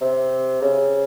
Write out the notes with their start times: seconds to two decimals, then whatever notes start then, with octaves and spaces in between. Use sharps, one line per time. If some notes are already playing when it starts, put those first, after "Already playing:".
0.01 C3
0.62 C#3